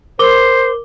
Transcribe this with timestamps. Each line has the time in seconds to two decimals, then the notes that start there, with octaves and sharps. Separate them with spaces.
0.19 A#4 C5 D6 G7